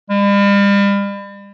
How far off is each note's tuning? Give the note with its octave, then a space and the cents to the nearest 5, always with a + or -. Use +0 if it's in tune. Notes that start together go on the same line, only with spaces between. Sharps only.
G3 +40